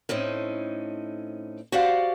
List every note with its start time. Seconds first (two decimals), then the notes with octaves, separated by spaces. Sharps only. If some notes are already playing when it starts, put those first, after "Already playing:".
0.09 A2 C4 C#4 D#4
1.72 F#4 G4 C5 D5 F5 F#5